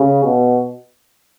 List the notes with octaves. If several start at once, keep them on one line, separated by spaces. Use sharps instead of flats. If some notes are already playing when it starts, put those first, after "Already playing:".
Already playing: C#3
B2